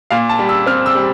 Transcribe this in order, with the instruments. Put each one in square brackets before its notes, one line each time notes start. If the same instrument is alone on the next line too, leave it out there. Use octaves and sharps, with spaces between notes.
[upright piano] A#2 F5
A5
G3
E6
C4 F6
E6
G3